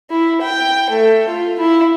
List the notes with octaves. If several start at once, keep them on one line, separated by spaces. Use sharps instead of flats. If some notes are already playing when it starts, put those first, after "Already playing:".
E4
G5
A3
F4
E4